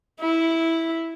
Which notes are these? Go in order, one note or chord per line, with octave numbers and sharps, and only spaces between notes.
E4